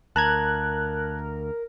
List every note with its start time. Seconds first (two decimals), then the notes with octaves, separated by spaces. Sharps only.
0.16 D2 A#4 A5 A#5 F#6 G#6